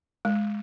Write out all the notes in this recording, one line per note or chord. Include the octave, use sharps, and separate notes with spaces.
G#3